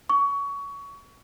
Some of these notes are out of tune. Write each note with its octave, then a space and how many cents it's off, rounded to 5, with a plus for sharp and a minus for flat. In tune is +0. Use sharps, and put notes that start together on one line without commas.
C#6 +20